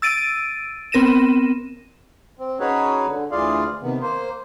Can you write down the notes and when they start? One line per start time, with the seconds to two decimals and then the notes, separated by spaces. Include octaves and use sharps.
0.02 E6 A6 D7 D#7
0.92 B3 C4 A#4 A#6 D#7 E7
2.39 C4
2.60 C#4 D#4 F#4 G#4 B4 C#5
3.07 D3
3.31 D2 E3 F4 G#4 D5 F5
3.83 C3 D#3 B3
4.01 A#3 C5